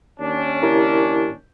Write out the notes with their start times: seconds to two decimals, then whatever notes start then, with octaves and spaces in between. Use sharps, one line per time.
0.19 D#2 C#4 D4
0.63 E4 G4 A#4